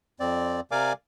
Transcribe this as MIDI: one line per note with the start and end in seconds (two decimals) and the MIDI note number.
0.20 0.60 41
0.20 0.60 60
0.20 0.60 74
0.71 0.93 48
0.71 0.93 70
0.71 0.93 74
0.71 0.93 77
0.71 0.93 80
0.71 0.93 86